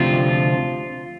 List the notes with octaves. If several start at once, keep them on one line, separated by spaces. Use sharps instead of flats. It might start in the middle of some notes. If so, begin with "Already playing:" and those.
Already playing: D2 C3 F3 F4